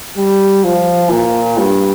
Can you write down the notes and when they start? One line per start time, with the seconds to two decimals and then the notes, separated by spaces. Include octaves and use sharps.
0.17 G3
0.64 F3
1.10 A#2
1.58 G2